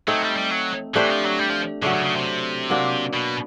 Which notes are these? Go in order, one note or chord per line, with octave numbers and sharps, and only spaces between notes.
F#3 A3 C4 D#4
G3
G3
F#3
E3 A3 D4 G4 C5
F3
F#3
G3
F3
C#3 F#3 A3 D4
C#3
C#3
C3
F#3 A#3 D4
B2